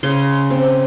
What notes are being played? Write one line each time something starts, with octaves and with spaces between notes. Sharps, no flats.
C#3 C6
C4